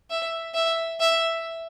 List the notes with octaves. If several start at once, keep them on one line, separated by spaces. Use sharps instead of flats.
E5
E5
E5